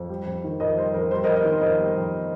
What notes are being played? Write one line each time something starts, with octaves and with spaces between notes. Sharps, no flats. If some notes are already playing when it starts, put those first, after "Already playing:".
Already playing: F2
G3
F2
D#3
F2 A#4 D#5
G3 C5
F2 A#4
G3 C5
A#4 D#5
F2
A#4 D#5
D#3 C5
F2 A#4 D#5
G3
F2